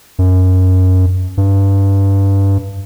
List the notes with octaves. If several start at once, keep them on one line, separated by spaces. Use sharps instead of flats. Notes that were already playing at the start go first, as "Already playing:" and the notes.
F#2
G2